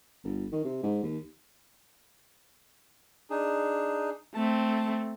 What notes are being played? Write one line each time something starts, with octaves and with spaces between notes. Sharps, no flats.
G1
D#3
C3
G#2
D#2
D4 D#4 G#4
A3 C4 A5